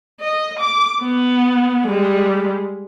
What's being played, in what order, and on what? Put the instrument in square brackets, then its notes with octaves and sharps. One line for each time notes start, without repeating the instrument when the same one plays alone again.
[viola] D#5
D6
B3
G3 G#3